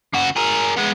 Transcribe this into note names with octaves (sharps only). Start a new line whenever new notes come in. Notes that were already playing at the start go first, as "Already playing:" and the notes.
C#3 F#4
G#4 A#4
G#3 B3